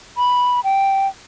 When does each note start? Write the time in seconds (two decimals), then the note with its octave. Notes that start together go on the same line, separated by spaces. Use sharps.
0.18 B5
0.64 G5